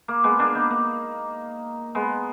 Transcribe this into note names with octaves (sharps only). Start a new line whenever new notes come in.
A#3
G#3 B3
A#3 D4
B3 D#4
A#3
G#3 B3